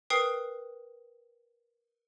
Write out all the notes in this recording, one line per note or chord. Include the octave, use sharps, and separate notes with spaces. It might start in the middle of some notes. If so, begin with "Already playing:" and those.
A#4 B4 G5 D#6 C7